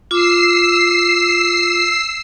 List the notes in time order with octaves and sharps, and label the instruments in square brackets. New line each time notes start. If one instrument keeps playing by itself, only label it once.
[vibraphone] F4 D6 [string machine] E6 C7